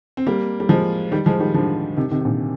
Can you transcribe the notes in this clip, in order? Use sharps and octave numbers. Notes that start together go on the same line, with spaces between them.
C4
G3 A#3
G3
F3 G#3
D#3 G3
F3 G#3
D#3 G3
D3 F3
C3 D#3
C3 D#3
D#3
A#2 D3